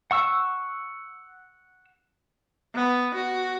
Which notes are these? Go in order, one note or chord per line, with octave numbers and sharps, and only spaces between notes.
F#5 C#6 E6
B3
F#4